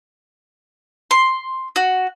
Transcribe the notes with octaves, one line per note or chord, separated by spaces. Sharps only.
C6
F#4